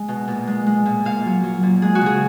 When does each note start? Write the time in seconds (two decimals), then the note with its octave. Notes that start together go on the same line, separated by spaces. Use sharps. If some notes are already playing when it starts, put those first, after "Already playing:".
Already playing: G#3
0.08 B2
0.28 A#2
0.47 G#3
0.66 G#3
0.86 A#2
1.05 A#2 F5
1.25 F#3
1.43 F#3
1.63 A#2
1.82 G#3 G#4
1.95 F#4
2.01 C#3 G#4